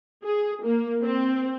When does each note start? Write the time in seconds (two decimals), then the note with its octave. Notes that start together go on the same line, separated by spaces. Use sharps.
0.25 G#4
0.64 A#3
1.02 C4